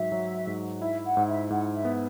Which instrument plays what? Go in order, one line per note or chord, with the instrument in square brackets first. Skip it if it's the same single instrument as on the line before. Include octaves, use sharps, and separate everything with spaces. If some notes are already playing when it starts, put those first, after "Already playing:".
Already playing: [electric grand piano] G#2 F#3 [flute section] E5
[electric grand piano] F#3
G#2
[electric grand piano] E4 [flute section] E5
[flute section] F#5
[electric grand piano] G#2
[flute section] E5
[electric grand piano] G#2 [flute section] F#5
[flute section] E5
[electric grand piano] B3